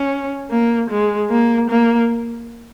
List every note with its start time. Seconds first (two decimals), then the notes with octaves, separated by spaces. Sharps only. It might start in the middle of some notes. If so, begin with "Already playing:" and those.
Already playing: C#4
0.50 A#3
0.90 G#3
1.30 A#3
1.70 A#3